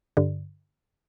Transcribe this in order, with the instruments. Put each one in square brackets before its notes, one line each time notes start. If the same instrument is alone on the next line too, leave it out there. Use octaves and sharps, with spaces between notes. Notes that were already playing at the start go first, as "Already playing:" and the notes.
[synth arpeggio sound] G2 D3